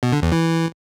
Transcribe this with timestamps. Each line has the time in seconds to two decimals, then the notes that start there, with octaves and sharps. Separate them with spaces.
0.03 B2
0.13 D3
0.22 E2
0.32 E3